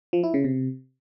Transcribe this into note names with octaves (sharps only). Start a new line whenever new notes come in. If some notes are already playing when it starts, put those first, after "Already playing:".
F3
E4
C#3
C3